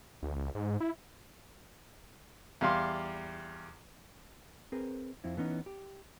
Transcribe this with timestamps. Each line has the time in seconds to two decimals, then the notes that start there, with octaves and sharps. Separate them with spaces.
0.23 D2
0.36 C#2
0.55 G#2
0.80 E4
2.61 E2 G3 F5 C6
4.72 C4 G#4 A#4 B4
5.24 F2 C4 E4
5.37 E3 B3 C#4 D#4
5.66 G4